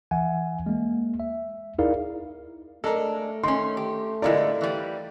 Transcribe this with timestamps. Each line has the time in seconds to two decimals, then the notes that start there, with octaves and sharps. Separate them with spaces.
0.11 E3 E5 F#5 G#5
0.66 G#3 A#3
1.20 E5
1.79 D#4 E4 G#4 A#4 D5 F5
2.84 G#3 A3 D4 A4 A#4
3.44 D#3 C#4 C6
3.77 G4
4.22 A2 D3 G#3 E4 F4 A#4 D5
4.61 E3 G3